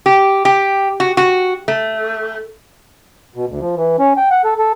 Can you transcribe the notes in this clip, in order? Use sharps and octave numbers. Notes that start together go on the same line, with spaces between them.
G4
G4
F#4
F#4
A3
B2
D2
F3
E3
C#4
G5
F#5
A4
A4